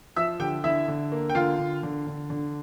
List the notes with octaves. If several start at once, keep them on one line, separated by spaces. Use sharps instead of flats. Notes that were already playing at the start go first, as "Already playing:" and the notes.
F3 E5 E6
D3 G4 G5
D3 E4 E5
D3
A#3
G5
D3 F4 F5
D3
D3
D3
D3